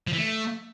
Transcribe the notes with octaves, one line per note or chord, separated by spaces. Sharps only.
F3
E3
A3